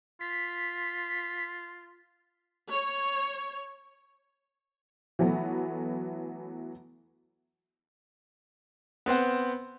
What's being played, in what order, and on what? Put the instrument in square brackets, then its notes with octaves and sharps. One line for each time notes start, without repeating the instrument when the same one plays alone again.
[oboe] F4 [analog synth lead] B6
[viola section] C#5
[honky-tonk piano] E3 F#3 A3 B3
[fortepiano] B3 C4 C5 F#5